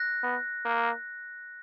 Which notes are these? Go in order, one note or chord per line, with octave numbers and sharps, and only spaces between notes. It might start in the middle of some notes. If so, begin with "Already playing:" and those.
Already playing: F#6 A#6
B3
A#3